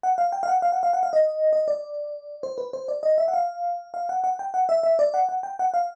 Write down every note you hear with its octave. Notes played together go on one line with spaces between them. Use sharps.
F#5
F5
G5
F5
F#5
F5
F#5
F5
F#5
F5
D#5
D#5
D5
C5
B4
C5
D5
D#5
E5
F#5
F5
F5
F#5
F#5
G5
F#5
E5
E5
D5
F#5
F#5
G5
F#5
F5